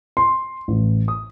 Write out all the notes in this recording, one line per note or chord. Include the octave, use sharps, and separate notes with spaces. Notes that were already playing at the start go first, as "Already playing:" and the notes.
C6
A1
D#6